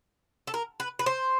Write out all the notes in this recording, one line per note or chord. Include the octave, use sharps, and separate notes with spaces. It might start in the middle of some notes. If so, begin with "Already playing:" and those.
A4
A#4
B4
B4
C5